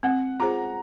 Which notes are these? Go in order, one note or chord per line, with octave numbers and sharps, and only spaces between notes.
C4 F#5
F4 G#4 C5 A#5